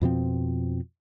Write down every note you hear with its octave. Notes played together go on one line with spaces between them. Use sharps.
F2 B2 F3 C4